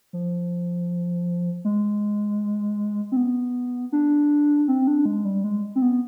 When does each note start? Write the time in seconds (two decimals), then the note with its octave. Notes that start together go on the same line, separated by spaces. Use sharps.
0.13 F3
1.65 G#3
3.12 C4
3.17 B3
3.92 D4
4.68 C4
4.87 D4
5.05 G#3
5.25 G3
5.44 G#3
5.76 C4
5.82 B3